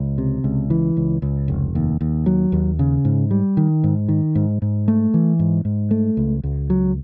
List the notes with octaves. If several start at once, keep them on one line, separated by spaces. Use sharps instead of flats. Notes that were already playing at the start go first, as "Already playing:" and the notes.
Already playing: C#2
C3
C#2
E3
C#2
C#2
F1
D#2
D#2
F#3
D#2
C#3
G#2
G3
D#3
G#2
D#3
G#2
G#2
A3
E3
G#2
G#2
A3
C#2
C#2
F#3